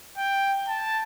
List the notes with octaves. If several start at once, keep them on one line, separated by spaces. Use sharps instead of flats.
G5
A5